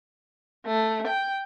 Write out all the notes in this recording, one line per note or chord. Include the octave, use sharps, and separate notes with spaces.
A3
G5